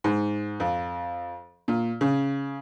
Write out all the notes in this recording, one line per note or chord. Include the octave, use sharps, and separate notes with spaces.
G#2
F2
A#2
C#3